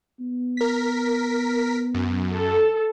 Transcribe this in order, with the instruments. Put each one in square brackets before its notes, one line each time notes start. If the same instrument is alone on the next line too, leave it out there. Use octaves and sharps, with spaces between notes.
[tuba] B3
[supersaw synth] A#4 B6
F#2
[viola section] A4